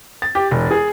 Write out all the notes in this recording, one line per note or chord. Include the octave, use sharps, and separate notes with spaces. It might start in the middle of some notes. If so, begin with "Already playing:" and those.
A6
G4
E1
G#4